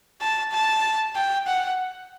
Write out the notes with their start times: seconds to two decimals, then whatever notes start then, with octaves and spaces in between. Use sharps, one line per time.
0.21 A5
0.52 A5
1.15 G5
1.47 F#5